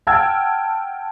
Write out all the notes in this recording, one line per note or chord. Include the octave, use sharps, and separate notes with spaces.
F#5 G5 A5 E6 F6 G#6